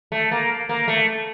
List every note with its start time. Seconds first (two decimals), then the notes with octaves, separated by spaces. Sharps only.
0.12 A3
0.32 A#3
0.69 A#3
0.88 A3